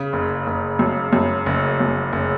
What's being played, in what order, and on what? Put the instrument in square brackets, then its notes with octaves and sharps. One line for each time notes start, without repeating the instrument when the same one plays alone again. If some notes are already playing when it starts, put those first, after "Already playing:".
Already playing: [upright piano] C#3
F#1
F#1
F#2
F#2
F#1
F#2
F#1